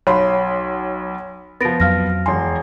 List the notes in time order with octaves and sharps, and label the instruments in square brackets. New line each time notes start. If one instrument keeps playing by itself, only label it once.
[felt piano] B1 B5 C6 [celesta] C#5 F5 A5
[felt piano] F3 B3 [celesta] A6 A#6 D7
[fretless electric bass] F2 F#3 [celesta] F5 F6 A#6
[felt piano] E1 C6 [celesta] G#5